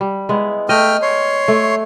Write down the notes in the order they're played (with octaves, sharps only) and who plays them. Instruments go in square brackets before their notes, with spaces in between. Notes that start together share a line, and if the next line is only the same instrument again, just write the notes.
[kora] G3
G#3 B3 E4
[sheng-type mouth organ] A3 G5 F6 [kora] D#5
[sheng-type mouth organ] C#5 C6
[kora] A3